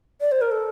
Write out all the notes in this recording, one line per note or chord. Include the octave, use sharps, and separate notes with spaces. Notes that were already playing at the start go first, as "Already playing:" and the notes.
D5
C5
A#4
A4